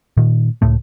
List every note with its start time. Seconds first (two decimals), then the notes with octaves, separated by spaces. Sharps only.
0.17 A#2 D#3
0.62 C#2 A2 A3